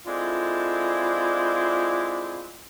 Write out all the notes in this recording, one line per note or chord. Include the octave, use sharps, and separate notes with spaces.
G#3 C4 D4 E4 F4 A4